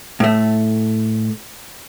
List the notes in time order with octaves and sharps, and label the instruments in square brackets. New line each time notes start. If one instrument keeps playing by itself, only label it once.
[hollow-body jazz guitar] A2 A3